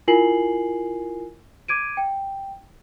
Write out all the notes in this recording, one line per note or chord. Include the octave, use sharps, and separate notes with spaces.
E4 F4 A#4 G#5 C7 F#7
D6 G#6 D7 D#7
G5